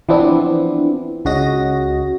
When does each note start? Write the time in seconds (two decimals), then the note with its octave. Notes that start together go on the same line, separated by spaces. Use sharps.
0.09 E3 F3 B3 C4 D4 E4
1.25 C#2 C#3 F#4 D#5 A#6